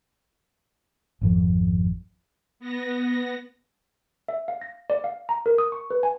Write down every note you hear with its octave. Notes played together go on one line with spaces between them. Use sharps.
G#1 F2 F3
B3 A#6
E5
F5
A#6
D5
F5
A#5
A#4
D#6
C#6
B4
G#5